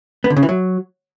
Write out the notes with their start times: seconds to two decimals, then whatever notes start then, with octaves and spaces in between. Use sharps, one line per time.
0.24 B3
0.30 D3
0.36 C#3
0.43 E3
0.49 F#3